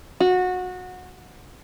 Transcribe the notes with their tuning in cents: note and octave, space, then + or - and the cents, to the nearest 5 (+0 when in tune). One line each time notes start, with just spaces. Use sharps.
F#4 -20